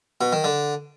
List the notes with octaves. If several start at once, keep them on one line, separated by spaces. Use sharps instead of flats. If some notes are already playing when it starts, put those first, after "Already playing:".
B2
D#3
D3